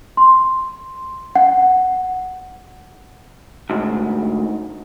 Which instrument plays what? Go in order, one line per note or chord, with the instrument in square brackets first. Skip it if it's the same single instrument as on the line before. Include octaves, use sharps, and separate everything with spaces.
[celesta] C6
F#5
[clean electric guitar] D2 G#2